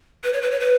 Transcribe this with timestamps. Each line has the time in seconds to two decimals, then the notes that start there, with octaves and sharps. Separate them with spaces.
0.24 B4
0.33 C#5
0.42 B4
0.51 C#5
0.60 B4